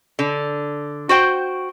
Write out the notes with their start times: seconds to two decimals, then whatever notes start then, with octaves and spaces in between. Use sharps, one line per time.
0.19 D3
1.09 F#4 C5 G5